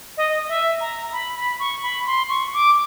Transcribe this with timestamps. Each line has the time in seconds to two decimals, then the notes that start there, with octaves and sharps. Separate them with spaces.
0.17 D#5
0.48 E5
0.81 A#5
1.12 B5
1.35 B5
1.60 C#6
1.83 B5
2.06 C6
2.30 C#6
2.54 D6